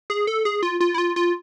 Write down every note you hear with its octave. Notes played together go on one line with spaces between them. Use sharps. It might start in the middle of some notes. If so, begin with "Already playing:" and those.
G#4
A4
G#4
F4
F4
E4
F4
F4